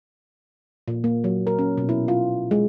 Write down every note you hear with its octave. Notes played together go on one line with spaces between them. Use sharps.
A#2
A#3
F#3
A#4
C#4
B2
E4
F4
G#3